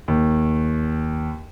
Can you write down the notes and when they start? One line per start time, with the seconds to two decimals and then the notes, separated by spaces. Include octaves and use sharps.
0.08 D#2